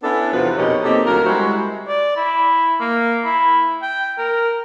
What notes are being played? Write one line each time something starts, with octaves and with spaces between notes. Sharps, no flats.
B3 C#4 D4 E4 A4
E2 C3 F3 F4 F#4 B4
F2 B2 C#4 D#4 G4 A#4
A#3 C4 D#4 G4 A4
D2 F#3 F4 A#4
G3 G#3 E4 F#4 C5
D5
E4
A#3
E4
G5
A#4